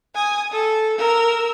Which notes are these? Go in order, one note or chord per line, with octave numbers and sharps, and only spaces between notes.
G#5 D#6
A4
A#4 E6